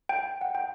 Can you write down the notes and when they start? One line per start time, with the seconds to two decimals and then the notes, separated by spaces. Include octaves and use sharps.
0.09 G5
0.41 F#5
0.55 G5